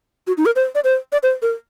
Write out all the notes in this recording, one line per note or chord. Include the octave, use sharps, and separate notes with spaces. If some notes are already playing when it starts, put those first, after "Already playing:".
F#4
D#4
A#4
C5
D5
C5
D5
C5
A#4